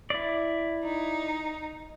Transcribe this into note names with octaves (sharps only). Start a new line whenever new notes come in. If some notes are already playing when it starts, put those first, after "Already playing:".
E4 D5
D#4